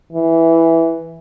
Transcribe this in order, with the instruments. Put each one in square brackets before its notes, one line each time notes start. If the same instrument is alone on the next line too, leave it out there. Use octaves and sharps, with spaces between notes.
[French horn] E3